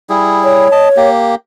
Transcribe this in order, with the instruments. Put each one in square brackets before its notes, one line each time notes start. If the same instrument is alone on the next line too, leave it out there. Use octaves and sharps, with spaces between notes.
[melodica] G3 E4 G#4
[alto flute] C#5
[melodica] D#5 A5
A#3 G4